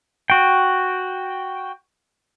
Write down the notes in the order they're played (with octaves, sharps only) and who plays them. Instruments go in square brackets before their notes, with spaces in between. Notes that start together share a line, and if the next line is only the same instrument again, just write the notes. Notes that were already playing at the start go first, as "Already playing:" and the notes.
[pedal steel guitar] F#4 G5